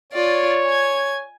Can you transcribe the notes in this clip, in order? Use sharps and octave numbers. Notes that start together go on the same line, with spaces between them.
F4 C#5 D5
G#5 G#6